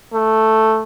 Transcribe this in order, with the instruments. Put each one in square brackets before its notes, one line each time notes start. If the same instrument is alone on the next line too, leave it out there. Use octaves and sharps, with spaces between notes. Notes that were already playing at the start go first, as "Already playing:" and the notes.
[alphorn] A3